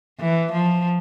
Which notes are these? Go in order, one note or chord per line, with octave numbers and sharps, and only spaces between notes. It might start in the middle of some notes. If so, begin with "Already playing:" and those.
E3
F3